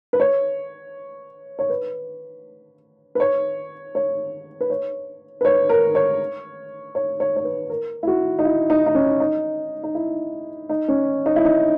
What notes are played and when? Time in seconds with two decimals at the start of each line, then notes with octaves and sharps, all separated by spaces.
0.13 B4
0.20 C#5
1.59 C#5
1.70 B4
3.15 B4
3.20 C#5
3.95 C#5
4.61 B4
4.70 C#5
5.41 B4
5.45 C#5
5.69 A#4
5.95 C#5
6.95 C#5
7.20 C#5
7.36 C#5
7.44 B4
7.70 A#4
8.03 E4
8.07 F#4
8.39 D#4
8.45 E4
8.70 D#4
8.86 D#4
8.95 C#4
9.20 D#4
9.83 D#4
9.95 E4
10.69 D#4
10.88 C#4
11.26 D#4
11.36 E4
11.45 D#4